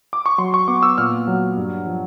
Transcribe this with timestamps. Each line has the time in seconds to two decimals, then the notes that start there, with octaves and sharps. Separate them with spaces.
0.13 D6
0.26 C#6
0.38 F#3 C6
0.54 C#6
0.68 B3 D6
0.83 E6
0.98 A#2 F6
1.27 F#3
1.57 G2
1.87 F3